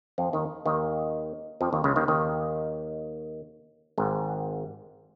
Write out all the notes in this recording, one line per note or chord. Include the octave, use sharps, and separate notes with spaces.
F2 F3
D#2 D#3
D#2 D#3
F2 F3
D#2 D#3
C#2 C#3
D#2 D#3
D#2 D#3
G#1 G#2